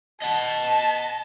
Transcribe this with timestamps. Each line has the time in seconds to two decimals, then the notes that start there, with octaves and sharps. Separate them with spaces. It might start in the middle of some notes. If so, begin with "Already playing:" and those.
0.22 D#5 F#5 A5